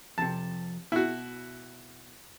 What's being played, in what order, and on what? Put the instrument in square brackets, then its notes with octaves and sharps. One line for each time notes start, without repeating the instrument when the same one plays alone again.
[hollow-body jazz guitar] F2 C3 [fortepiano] A5
[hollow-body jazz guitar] B2 [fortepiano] E4 F#4